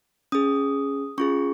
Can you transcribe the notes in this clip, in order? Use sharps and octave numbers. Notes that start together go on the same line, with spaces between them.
C#4 G#4 D#6
C#4 F4 G#4 C#6